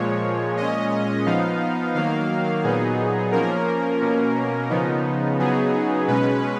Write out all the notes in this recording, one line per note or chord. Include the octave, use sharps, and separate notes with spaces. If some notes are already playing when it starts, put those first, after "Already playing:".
Already playing: A#2 F3 G#3 C#5
A#2 G#3 C#4 D#5
F3 B3 D#4 F5
D#3 F#3 A#3 F5
A#2 F#3 B3 D#4 G#4
F3 A#3 C#4 A#4
B2 A#3 C#4
C#3 F3 B3 D#4
C#3 F#3 B3 D#4 G#4
B2 G#3 C#4 B4